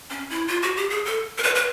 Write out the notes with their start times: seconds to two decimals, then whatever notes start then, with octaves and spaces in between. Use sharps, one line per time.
0.10 C#4
0.30 E4
0.48 F4
0.62 F#4
0.77 G4
0.90 G#4
1.06 A4
1.38 A#4
1.43 B4
1.55 B4